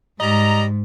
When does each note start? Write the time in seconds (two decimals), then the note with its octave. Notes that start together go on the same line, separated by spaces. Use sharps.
0.20 G#2 G3 D#5 A#5